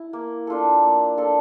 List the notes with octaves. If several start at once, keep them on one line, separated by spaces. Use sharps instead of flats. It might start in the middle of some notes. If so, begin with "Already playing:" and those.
Already playing: E4
A#3
D4 F4 A4
A#3
D4 F4 A4